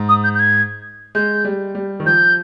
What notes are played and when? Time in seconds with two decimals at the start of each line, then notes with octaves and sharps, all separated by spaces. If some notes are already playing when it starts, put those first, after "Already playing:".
Already playing: G#2
0.08 D#6
0.24 G6
0.34 G6
0.39 G#6
1.15 G#3 G6
1.45 G3
1.75 G3
2.00 D#3
2.05 F3 G6